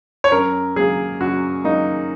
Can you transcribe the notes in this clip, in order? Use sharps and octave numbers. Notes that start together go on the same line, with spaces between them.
C#5
F#2 A#4
F#3 A#3 G#4
F#2 F#4
F#3 A#3 D#4